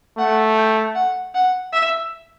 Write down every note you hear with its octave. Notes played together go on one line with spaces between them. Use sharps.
A3 F#5
G5
F#5
F#5
E5